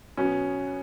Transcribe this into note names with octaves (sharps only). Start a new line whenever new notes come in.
B2 F#3 B3 C#4 F#4